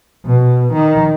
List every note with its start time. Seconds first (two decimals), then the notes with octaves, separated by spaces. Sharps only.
0.25 B2
0.73 D#3